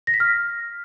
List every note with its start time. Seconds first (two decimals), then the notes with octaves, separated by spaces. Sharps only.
0.07 A#6
0.14 B6
0.20 F6